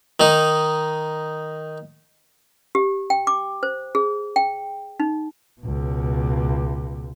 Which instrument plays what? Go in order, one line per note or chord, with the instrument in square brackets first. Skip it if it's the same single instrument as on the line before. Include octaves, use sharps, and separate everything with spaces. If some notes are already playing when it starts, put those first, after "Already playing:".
[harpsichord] D#3 D#4
[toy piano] G4
G5
D6
C5
G#4
G5
D#4
[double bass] C#2 B2